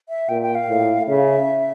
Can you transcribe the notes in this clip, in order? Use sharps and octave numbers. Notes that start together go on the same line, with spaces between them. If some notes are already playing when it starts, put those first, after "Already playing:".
E5
A#2 G5
G5
F5
A2
C#3 E5